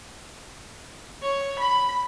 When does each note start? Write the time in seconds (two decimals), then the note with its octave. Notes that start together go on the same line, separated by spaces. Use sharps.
1.22 C#5
1.59 B5